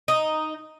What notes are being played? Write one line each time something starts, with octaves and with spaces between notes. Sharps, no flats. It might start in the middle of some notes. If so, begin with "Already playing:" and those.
D#4